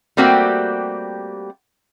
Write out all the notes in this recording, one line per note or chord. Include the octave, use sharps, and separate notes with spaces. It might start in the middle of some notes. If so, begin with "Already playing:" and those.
G3 A3 A#3 C4 F#4 G4